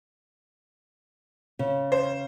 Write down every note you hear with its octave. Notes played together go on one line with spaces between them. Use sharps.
C#3
C5